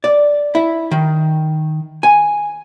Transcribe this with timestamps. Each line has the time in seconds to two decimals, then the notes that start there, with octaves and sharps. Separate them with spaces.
0.04 D5
0.55 E4
0.91 D#3
2.03 G#5